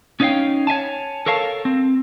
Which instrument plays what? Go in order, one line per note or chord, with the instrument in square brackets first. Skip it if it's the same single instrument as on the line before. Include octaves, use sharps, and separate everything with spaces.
[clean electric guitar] C#4 D#4 C#5 D#5 F5 G5
C#5 E5 G#5 A5
A4 A#4 C#5 F5 A5
C4